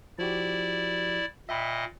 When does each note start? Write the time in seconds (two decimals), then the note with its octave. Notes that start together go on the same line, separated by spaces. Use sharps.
0.19 F3 E4 F#4 G4 D5
1.49 A#2 D#5 E5 G5 B5